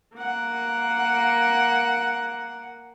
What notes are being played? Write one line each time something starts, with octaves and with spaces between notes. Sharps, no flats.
A#3 F#5